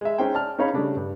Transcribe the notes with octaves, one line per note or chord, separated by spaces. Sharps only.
G#3 E5
G#3 C#4 D#4 C5 G5
D5 A5 F6
C#4 D#4 G#4 C#5 F5 B5
C#3 G3 A3 D4
G2